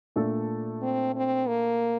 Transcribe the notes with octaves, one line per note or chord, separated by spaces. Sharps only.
A#2 A3 D4 A4
C4
C4
A#3